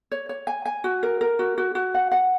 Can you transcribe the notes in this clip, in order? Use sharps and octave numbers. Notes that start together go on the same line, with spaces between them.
C#5
C#5
G#5
G#5
F#4
A#4
A#4
F#4
F#4
F#4
F#5
F#5